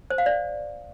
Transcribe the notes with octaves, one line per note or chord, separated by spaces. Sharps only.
C5
F5
D5